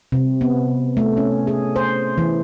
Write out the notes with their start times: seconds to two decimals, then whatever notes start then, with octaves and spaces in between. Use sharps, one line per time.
0.12 C3
0.41 B3
0.97 A3
1.17 C#4
1.47 G#4
1.76 C5
2.18 E3